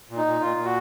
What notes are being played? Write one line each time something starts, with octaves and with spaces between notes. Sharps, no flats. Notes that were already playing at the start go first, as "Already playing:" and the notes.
A#2
D#4
A#2
A#2 F4
A#2
F#4